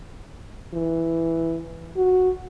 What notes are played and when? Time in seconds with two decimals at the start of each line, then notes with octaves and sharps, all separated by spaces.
0.74 E3
1.97 F#4